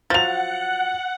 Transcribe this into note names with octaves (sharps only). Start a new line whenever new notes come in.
F3 F#3 F#5 A6 F7